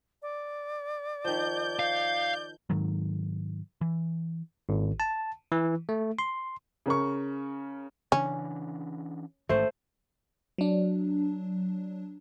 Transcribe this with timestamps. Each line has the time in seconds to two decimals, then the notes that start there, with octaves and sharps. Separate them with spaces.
0.22 D5
1.24 D#3 F3 G6
1.79 F5
2.70 G#2 D#3 F#3
3.81 E3
4.69 G#1
5.00 A5
5.52 E3
5.89 A3
6.19 C6
6.86 C#3 A#4 C#6
8.12 C#3 E3 C#4 D4
9.49 A1 G#2 D#3 A3 C5
10.58 F#3 D4